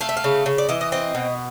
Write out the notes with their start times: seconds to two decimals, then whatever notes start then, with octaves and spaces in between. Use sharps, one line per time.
0.01 A3 F5
0.09 E5
0.17 F5
0.24 C#3
0.46 C#3
0.58 D5
0.69 E3 D#5
0.81 D#5
0.92 C4 D#5
1.15 B2